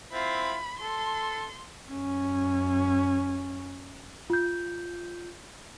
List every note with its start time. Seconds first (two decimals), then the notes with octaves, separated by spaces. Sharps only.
0.12 C4 E4 F4 B5
0.79 A4 C6
1.90 F#2 C#4
4.30 F4 G6